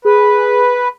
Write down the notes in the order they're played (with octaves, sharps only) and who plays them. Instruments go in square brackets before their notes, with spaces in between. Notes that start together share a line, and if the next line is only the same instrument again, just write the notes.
[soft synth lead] G#4 [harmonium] B4